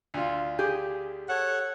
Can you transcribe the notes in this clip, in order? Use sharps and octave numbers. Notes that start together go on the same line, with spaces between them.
D2 F4
G4 G#4
A4 C#5 F#5